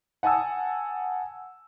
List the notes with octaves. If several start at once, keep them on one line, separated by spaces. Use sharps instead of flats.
F#5 G#5 A5 D#6 E6